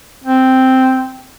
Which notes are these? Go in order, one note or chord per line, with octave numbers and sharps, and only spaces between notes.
C4